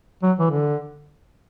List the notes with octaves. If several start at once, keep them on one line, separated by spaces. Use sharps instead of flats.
F#3
E3
D3